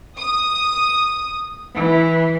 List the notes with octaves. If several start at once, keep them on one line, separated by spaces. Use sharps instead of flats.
D#6
E3